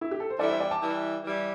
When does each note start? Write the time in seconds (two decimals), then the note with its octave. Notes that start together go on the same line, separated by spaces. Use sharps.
0.01 E4
0.11 G4
0.20 A4
0.30 C5
0.39 E3 G3 E4 A4 D5
0.50 C5 E5
0.60 D5 G5
0.71 A5 D6
0.82 E3 G3 E4
1.24 E3 G3 E4